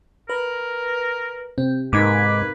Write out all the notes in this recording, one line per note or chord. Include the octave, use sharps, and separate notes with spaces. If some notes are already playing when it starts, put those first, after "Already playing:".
A#4 B4
C3 C4
G#2 A#3 D#4 B4 D6 G#6 B6